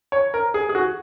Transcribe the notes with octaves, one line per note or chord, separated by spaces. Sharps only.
C#5
A#4
G#4
G#4
F#4